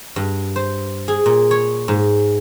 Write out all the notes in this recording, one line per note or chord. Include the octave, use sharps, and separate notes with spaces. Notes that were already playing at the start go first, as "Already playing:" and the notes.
G2
C5
G#4
A#2
C#5
G#2